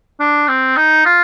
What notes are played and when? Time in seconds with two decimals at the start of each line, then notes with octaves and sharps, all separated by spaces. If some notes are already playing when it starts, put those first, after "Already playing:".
0.20 D4
0.48 C4
0.76 D#4
1.06 F4